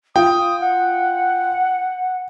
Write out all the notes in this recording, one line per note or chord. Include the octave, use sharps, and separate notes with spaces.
F4 G5 D#6
F#5